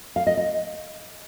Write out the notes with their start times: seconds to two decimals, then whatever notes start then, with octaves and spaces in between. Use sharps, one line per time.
0.16 F5
0.27 D#5
0.37 D#5